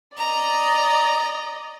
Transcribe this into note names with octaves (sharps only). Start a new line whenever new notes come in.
D5 D#5 A#5